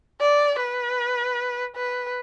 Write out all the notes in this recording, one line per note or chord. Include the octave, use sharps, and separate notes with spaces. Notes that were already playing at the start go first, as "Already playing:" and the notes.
D5
B4
B4